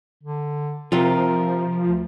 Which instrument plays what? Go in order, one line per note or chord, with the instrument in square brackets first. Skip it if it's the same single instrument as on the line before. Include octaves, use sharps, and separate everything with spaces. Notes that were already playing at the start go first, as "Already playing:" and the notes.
[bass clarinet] D3
[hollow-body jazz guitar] C3 F4 [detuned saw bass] F3 [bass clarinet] A#4
[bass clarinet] D2